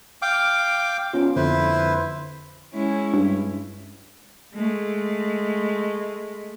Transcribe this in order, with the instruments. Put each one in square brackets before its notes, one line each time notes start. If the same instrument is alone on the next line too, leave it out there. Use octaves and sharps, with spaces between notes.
[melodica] F5 G5 D6
[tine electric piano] B3 C#4 F4
[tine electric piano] F2 D3 [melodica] E4 B4 C5
[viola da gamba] G#3 C#4 E4
[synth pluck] G2
[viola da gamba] G#3 A3